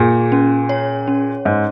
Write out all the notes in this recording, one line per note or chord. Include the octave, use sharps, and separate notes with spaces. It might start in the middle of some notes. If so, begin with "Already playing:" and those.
Already playing: A#2 G#4
C#4
C#5
C#4
G#2 C#4